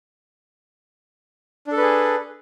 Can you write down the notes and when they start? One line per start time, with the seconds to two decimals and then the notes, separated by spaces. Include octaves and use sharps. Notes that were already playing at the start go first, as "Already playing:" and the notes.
1.67 D4
1.72 A4
1.77 B4
1.82 G#4